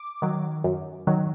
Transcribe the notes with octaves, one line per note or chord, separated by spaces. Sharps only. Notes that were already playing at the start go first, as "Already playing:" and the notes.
Already playing: D6
D#3 F#3
F#2
D#3 F#3